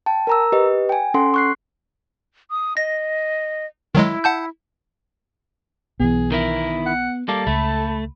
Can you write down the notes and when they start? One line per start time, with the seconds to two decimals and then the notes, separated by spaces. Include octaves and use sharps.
0.06 G5 A5
0.27 A#4 A#5 E6
0.52 G4 B4 D#5
0.89 G5 G#5
1.14 C#4 A4 F#5 C6
1.34 C#6 F#6 C7
2.51 D#6
2.77 D#5 A#6
3.95 D#3 F#3 G#3 E4
4.24 F#5 A5 G6
6.00 B1 E3 B3 G#4
6.32 D#3 E4 A#4
6.86 F#5
7.28 G3 A#3 A4 D6
7.47 C#2 A3 B5